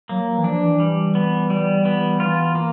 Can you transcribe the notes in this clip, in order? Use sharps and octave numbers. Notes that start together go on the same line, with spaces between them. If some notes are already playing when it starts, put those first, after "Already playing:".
F#3 A#3
F#3
E3
F3 D4
E3
G3
B3
G3
B3
E3 F4
A#3